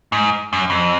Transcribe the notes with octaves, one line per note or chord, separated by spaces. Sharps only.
G#2
F#2
F2